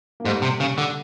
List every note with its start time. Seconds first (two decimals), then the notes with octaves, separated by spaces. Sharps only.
0.20 A#3
0.24 G#2 G3 A3
0.42 C3
0.60 C#3
0.78 D3